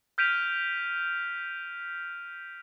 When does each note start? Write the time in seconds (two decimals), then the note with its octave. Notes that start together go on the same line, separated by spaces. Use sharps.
0.18 F6 G6 B6 D7 D#7 F7